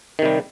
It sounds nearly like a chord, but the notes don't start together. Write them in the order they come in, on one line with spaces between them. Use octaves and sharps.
D#3 C3 G3